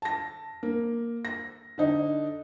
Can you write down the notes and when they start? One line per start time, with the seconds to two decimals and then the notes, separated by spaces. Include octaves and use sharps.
0.02 A5 A#6
0.63 A#3
1.25 A#6
1.78 D3 D#4